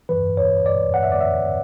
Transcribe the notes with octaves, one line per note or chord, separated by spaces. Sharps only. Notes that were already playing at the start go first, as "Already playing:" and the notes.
G2 E3 B4
C#5
D5
F#5
E5
D5
E5